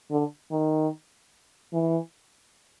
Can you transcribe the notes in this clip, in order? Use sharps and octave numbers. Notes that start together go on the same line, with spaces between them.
D3
D#3
E3